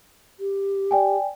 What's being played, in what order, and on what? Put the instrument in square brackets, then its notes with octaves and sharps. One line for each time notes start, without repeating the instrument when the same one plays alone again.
[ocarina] G4
[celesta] D5 G5 G#5